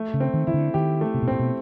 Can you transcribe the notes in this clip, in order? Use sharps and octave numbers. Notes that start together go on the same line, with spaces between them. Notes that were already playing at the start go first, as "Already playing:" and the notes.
Already playing: A3
C#3
C4
D#3
D#3 E4
D3
D#3 G4
A3
C3
B2
A#2 C4
B2